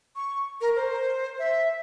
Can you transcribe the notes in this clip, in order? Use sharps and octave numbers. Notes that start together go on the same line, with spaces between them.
C#6
A#4
C5
E5